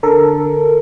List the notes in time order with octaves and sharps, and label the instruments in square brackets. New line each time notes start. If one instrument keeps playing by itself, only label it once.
[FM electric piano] D3 A4 A#4